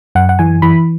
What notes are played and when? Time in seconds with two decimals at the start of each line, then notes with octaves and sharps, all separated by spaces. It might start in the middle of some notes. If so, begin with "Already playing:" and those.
0.15 F#2 F#5
0.29 F#5
0.39 E3 G#5
0.62 E3 B5